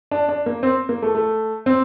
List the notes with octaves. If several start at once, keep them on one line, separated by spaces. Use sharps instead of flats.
D4
D4
A#3
C4
A#3
A3
A3
C4